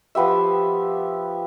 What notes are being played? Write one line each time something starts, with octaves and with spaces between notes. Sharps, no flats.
F3 B3 G4 E5